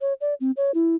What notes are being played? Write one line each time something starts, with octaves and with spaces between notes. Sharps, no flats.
C#5
D5
C4
C#5
E4